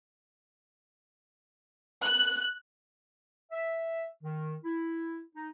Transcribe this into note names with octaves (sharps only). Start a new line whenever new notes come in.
F#6
E5
D#3
E4
D#4